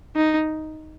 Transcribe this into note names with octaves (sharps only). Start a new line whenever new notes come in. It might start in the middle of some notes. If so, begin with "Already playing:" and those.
D#4